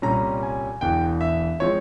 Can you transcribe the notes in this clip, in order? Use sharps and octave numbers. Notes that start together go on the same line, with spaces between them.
C2 A#2 G3 C#4 A#5
G#5
E1 E2 E3 G5
E5
F3 G#3 C4 C#5